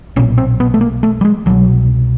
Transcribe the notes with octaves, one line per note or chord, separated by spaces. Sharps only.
B1 A#2 C#4
C4
B3
A3
A#3
A3
G3
G#3
C2 B2 F#3